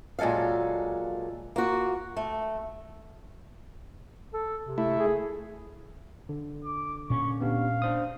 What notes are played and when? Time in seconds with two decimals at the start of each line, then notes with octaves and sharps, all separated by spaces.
0.19 A#2 F#3 G#3 A4 F5
1.56 A#3 F4 F#4
2.17 A3
4.34 A4
4.66 C3
4.78 A3 E4
4.99 G#4
6.29 D3
6.64 D6
7.10 A#2 C#4 C#6
7.41 B3 D4 G4 F5
7.82 D4 C5 D#6